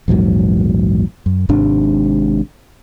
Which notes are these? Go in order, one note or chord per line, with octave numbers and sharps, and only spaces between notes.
A#1 E2 G#2 F#3
F#2
G#1 G#2 C3 D4